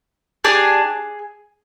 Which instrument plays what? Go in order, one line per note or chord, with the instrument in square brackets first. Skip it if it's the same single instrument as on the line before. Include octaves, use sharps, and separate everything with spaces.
[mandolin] D4 G4 G#4 G#5